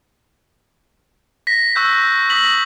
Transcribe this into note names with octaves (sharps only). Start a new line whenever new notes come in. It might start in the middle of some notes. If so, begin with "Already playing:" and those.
A#6 B6
C#6 E6 F#6 G6
C#6 D#6 A#6 B6 F#7